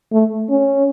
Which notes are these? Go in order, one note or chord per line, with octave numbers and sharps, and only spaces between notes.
A3
C#4